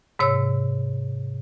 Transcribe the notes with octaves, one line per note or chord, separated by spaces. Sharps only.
G#2 C3 C#5 E6